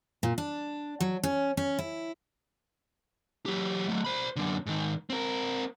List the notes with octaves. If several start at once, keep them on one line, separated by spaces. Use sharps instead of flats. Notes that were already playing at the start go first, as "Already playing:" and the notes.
A#2
D4
F#3
C#4
C#4
E4
F#3 G4
F#3 A3
C5 B5
F#2 D3
G#2 D#3
C4 A#4